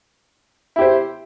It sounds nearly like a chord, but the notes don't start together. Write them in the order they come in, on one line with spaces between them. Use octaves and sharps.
E4 G4 C5